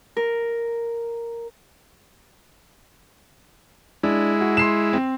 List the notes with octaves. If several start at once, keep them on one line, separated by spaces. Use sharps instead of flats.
A#4
G#3 D4 E4
F#4
C6 C7 E7
C4